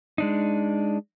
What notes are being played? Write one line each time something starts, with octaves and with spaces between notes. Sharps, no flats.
G#3 D4 D#4